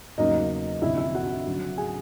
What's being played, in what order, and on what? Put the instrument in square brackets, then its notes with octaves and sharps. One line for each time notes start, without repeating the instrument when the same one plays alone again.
[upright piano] E2 C#3 F#3 A#3 D#4 D#5
D2 C3 F3 E4 E5
E4 E5
F#4 F#5
D2 C#3 F#3
G#4 G#5